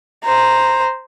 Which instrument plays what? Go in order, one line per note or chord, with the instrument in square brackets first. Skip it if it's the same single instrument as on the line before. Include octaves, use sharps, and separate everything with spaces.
[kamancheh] C5 A#5